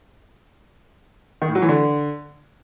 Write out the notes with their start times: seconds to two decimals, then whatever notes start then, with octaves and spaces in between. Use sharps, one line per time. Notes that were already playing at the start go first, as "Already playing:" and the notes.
1.42 D#3
1.48 A2
1.55 F#3
1.62 E3
1.69 D3